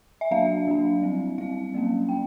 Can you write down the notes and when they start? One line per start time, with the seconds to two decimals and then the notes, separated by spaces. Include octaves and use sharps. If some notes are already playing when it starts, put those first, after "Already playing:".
0.21 E5
0.31 F#3 A#3 D4 F5
0.67 F#3 A#3 D4
1.02 G3 C4
1.38 G3 C4 F5
1.74 F#3 A#3 C#4
2.09 F#3 A#3 G5